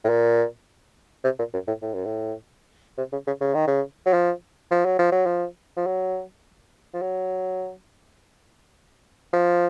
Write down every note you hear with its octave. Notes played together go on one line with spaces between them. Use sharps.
A2
A#2
C3
A#2
F#2
A2
A2
F#2
A2
C3
C#3
C#3
C#3
D#3
C#3
F#3
F3
F3
F#3
F3
F#3
F3
F3
F#3
F3
F#3
F3